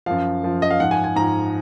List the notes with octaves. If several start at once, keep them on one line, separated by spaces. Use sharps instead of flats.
F#2 F3 F5
F#2 F3
D#5
F5
G#2 F3 F#5
G#5
G#5
G#2 F3 A#5